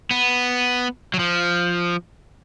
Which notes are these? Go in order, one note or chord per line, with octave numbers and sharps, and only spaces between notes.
B3
F#3
F3